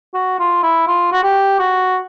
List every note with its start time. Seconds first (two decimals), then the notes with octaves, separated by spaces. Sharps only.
0.14 F#4
0.39 F4
0.63 E4
0.87 F4
1.12 F#4
1.23 G4
1.59 F#4